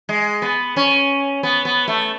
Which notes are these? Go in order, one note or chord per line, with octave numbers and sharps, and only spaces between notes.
G#3
B3
C#4
B3
B3
A3